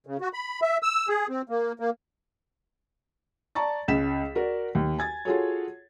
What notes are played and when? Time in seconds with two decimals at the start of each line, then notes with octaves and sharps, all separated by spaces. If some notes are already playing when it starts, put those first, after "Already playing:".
0.07 C#3
0.21 F#4
0.33 B5
0.62 E5
0.83 E6
1.08 G#4
1.29 C4
1.49 A#3
1.80 A#3
3.55 D5 A5 A#5 C#6 A6
3.88 C#2 C#4 B6 E7
4.35 F#4 A#4 D5
4.75 D#2
4.98 G#5 G#6 A6
5.25 F4 F#4 G#4 A4 C#5